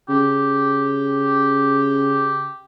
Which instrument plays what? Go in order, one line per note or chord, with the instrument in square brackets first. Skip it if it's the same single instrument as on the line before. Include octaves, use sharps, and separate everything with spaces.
[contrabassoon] C#3 [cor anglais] G4